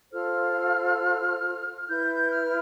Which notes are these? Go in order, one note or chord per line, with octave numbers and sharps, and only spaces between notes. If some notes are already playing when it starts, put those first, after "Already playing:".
F4 A4 C5 F6
E4 B4 G6
F6